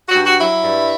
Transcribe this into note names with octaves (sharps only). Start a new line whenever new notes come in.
F#4
G2
F#4
F#3 E4
G2